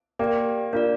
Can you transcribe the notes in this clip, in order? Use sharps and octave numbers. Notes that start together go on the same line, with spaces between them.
A#3 G4 D5 G5
A#3 D4 F4 D5